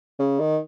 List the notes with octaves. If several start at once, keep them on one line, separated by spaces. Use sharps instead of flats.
C#3
D#3